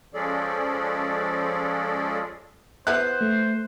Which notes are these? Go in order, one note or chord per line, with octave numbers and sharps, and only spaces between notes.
F3 G#3 C#4 G#4 A4 D5
B3 E4 C5 F#6
A3